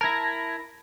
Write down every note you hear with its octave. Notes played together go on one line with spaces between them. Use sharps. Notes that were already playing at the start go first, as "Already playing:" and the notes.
E4 A#4 A5 G#6 A#6